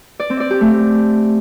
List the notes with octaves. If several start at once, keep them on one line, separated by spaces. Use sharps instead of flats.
D5
C4
D5
G4
A3